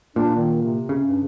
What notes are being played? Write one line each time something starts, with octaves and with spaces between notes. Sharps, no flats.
A#2 D4
D#3
C3
C#3
G2